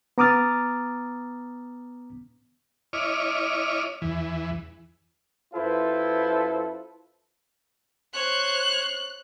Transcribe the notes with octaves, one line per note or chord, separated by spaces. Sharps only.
B3 A#5 D6 D#6 F6 A6
E4 C#5 D#5 D6 F6
E2 E3
F#2 E4 F4 A4 B4 C5
C5 C#5 F#6